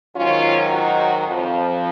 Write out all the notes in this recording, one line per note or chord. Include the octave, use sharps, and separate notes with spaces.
G#2 D#3 F#3 C#4 F4
D#4 F#4
F2 F3